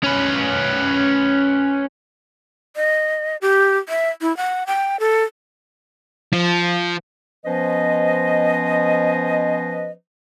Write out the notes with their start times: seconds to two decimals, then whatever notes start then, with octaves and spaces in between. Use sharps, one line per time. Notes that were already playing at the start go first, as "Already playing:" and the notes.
0.04 C#4 B4
2.76 D#5
3.42 G4
3.89 E5
4.21 E4
4.37 F#5
4.67 G5
5.00 A4
6.33 F3
7.45 F3 B3 C#4 B4 C5 D#5